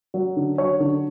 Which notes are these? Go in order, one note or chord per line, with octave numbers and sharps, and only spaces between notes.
F#3
D3
F#3 C#5
D3